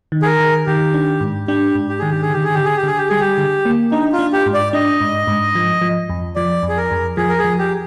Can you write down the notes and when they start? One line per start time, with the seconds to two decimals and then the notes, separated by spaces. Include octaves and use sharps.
0.12 D#3
0.22 G#4
0.26 A#4
0.40 D#3
0.66 D#3 G4
0.94 D4
1.21 G#2
1.48 D4 G4
1.75 G#2
1.89 G4
1.99 D#3 G#4
2.10 G4
2.22 G#4
2.30 D3 G4
2.44 G#4
2.54 D3 G4
2.65 G#4
2.77 G4
2.84 D3 G#4
2.97 G4
3.09 G3 G#4
3.20 G4
3.38 D3
3.65 A#3
3.92 D4 D#4
4.12 F4
4.19 D4
4.33 G4
4.46 G#2
4.54 D5
4.73 D4 D#5
5.01 G#2
5.27 G#2
5.55 F3
5.82 F3
6.10 F2
6.36 F3 D5
6.63 F2
6.69 G#4
6.77 A#4
6.91 F2
7.17 F3 G#4
7.29 A#4
7.39 G#4
7.44 F3
7.59 G4